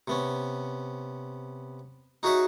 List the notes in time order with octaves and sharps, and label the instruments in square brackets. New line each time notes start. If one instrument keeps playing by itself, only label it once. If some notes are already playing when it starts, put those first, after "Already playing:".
[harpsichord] C3 B3 C#4
D#4 F#4 G#4 C#5 E5 F#5